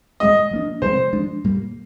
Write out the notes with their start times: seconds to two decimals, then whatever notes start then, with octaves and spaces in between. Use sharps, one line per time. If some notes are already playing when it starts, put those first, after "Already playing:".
0.20 A#2 G#3 C4 D#5
0.51 F3 A#3 D4
0.82 C3 F3 G#3 C4 C5
1.13 F3 G#3 D4
1.44 A#2 G3 A#3